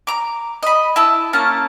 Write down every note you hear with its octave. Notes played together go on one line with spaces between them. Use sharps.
A#5 D6
D#5 B5
E4 A5 E6
A#3 C#4 A5 A#5